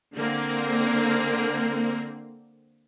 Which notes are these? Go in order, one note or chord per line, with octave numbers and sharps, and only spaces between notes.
D3 A#3 C4